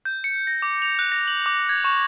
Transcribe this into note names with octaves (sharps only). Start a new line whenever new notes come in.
G6
C#7
A#6
D6
F7
F#6
A#6
F#7
D6
G#6
C#6